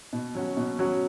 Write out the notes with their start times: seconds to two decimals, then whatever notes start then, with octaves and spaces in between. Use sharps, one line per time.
0.13 B2
0.35 F#3 C#4 F#4
0.57 B2
0.79 F#3 C#4 F#4